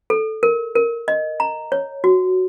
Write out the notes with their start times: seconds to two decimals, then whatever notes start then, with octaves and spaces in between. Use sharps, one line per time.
0.10 A4
0.43 A#4
0.76 A#4
1.08 D#5
1.40 A#5
1.72 C#5
2.04 F#4